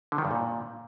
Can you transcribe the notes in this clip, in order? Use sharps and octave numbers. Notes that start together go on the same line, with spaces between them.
D3
D#3
G2
A#2